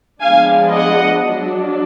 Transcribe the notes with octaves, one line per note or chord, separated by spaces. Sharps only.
F3 G#3 B3 D4 F5 G#5
D#5 F#5
F#3 D4